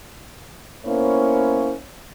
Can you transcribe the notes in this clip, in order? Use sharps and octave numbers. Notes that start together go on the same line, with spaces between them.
A#3 B3 C#4 E4 C5 C#5